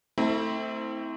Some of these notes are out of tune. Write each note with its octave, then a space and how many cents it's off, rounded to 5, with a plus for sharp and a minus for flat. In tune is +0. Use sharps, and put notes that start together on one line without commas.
A3 +25 C4 +0 E4 -35